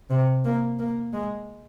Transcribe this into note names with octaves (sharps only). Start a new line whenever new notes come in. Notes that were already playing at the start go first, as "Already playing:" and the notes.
C3
A#3
A#3
G#3